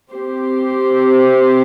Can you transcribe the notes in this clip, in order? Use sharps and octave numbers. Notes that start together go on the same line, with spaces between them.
C4 G4 C5